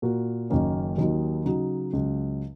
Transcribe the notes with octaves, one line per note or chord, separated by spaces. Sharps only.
A#2 A#3 F#4 A#4
F#1 F#2 D#3 A#3 C#4
D#2 D#3 F#3 D#4
C#3 F#3 D#4 F#4
C#2 C#3 F#3